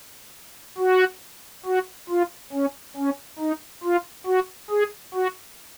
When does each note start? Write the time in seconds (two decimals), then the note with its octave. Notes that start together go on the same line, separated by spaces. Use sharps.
0.78 F#4
1.66 F#4
2.09 F4
2.52 C#4
2.97 C#4
3.39 D#4
3.83 F4
4.26 F#4
4.70 G#4
5.14 F#4